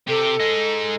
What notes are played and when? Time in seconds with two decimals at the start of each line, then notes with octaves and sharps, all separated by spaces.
0.09 C3 G4 A4
0.40 G#3 D#4